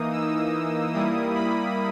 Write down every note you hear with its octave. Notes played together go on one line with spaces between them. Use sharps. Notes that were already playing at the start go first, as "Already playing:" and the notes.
Already playing: E3 A#3 D#4 D#6
E6
G3 A#3 E4 D#6
B5